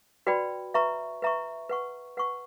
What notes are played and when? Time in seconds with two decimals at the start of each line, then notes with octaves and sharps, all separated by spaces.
0.27 F#4 B4 D5 G5 B5
0.74 B4 E5 A#5 C#6
1.22 B4 E5 A#5 C#6
1.69 B4 F#5 C#6
2.17 B4 F#5 C#6